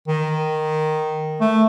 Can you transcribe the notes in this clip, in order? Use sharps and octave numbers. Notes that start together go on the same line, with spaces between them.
D#3
A3